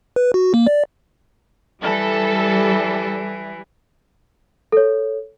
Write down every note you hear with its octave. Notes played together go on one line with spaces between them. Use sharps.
B4
F#4
A#3
D5
E3 G3 A4
A4 C#5